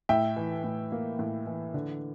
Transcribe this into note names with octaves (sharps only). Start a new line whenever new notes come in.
A2 E5 G5
E3
A2
A#3
A2
E3
D3